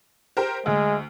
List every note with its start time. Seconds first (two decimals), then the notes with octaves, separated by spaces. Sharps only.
0.37 G4 A#4 C5
0.66 D2 G#3